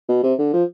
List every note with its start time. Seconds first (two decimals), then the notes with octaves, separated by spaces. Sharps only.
0.08 B2
0.23 C3
0.38 D3
0.53 F3